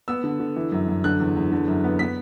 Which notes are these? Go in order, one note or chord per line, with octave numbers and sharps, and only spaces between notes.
B3 E6
D3
D3
E3
F#2
F#2
D3 F#6
E2
E2
D3
F#2
B3
B3 B6